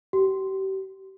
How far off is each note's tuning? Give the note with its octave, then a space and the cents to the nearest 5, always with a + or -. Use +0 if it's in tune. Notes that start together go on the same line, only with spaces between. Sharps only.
G4 -35